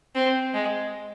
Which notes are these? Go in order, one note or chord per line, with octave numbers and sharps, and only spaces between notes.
C4
G#3